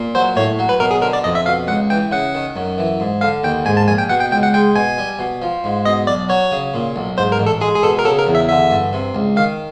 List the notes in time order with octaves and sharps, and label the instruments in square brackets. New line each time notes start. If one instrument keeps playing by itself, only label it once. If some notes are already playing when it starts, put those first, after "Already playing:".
Already playing: [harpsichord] A#2
[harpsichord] F#3 [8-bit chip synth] C5
[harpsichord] A2 [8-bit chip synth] C#5
[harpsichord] F#3
[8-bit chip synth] B4
[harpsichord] B2 [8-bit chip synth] A#4
[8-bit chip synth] G#4
[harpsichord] D3 [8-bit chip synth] A#4
[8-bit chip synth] D5
[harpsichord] F2 [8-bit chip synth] D#5
[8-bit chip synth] E5
[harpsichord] B2 [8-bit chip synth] F5
[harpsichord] C#2 [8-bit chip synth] F#5
[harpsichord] E3 [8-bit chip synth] G5
[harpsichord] C#3 [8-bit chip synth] F#5
[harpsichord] D#3
F#2
E3
G#2
[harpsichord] D3 [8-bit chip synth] F5
[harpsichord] D#2 [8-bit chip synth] G5
[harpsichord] G#2 [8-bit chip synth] G#5
[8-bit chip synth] A5
[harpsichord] A#1 [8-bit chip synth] G#5
[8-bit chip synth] G5
[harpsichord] B2 [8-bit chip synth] F#5
[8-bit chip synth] G5
[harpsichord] C#2 [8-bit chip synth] G5
[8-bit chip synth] F#5
[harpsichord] G#3 [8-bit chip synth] G5
[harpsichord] B2 [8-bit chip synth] G#5
[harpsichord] G3
B2
F3
G#2
[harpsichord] B2 [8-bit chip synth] D#5
[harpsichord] B1 [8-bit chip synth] D5
[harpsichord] F#3 [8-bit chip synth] C#5
[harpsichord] C#3
A#2
B1
[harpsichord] G#2 [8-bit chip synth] C5
[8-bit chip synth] A#4
[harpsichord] A1
[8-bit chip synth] A4
[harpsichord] G#3 [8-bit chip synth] G#4
[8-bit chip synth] G#4
[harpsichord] B2 [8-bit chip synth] A4
[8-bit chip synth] A#4
[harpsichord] C#3 [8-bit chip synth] A4
[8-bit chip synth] A#4
[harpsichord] E2
[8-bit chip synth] E5
[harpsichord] D3 [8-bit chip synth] E5
[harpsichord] G2
C3
C#2
[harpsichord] D#3 [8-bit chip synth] F5